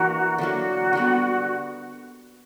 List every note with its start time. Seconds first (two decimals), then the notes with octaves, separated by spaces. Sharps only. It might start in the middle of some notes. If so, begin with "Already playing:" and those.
Already playing: E3 A#3 D4 E4 F#4 A#4
0.38 D3 F#3 A#3 F#4
0.93 D3 G3 B3